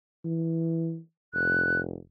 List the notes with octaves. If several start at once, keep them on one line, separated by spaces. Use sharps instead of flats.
E3
F1 F#6